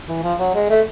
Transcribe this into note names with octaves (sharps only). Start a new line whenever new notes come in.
E3
F3
F#3
G#3
A3